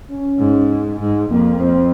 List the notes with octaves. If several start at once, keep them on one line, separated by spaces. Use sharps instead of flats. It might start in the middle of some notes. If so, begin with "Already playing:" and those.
C#4
G#2
G#2
F2 A#3
C4